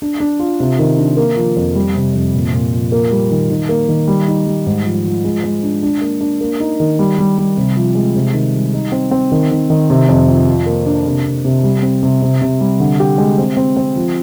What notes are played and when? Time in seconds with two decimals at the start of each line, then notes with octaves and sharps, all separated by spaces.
0.02 D4
0.20 D4
0.39 F4
0.60 C3
0.79 D#3
0.98 D4
1.17 A#3
1.36 F3
1.56 F2
1.75 G3
1.95 C3
2.14 F2
2.34 A#2
2.53 A#2
2.72 F3
2.92 A#3
3.11 G3
3.31 D#3
3.51 D#3
3.69 A#3
3.89 D#3
4.08 G3
4.28 D#4
4.47 G3
4.66 G#2
4.85 F3
5.05 F3
5.24 G#3
5.44 G#3
5.63 D4
5.83 D4
6.01 A#3
6.21 D4
6.41 A#3
6.60 D#4
6.80 D#3
6.99 G3
7.19 G3
7.38 G3
7.57 C3
7.77 F3
7.95 G#3
8.16 C3
8.34 D#3
8.53 G3
8.73 D#4
8.92 C4
9.11 C4
9.32 D#3
9.51 D#3
9.70 D#3
9.90 C3
10.09 F2
10.28 F3
10.48 F4
10.66 A#3
10.86 D4
11.06 C3
11.26 C3
11.45 C3
11.63 G3
11.82 C4
12.03 C3
12.22 C3
12.42 C3
12.61 G3
12.80 D3
13.00 G4
13.18 G#3
13.38 C4
13.57 C4
13.77 C4
13.96 F3